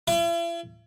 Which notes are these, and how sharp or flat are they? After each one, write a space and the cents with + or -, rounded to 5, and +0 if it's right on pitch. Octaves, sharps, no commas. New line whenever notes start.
E4 +45